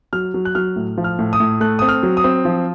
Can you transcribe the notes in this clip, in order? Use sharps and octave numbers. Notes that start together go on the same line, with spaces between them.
F#3 F6
F#3
F#6
F#3 F6
A2
F3
F6
A2
D#6
A2
A3 F#6
C4 D#6
F6
F#3
D#6
C4
F3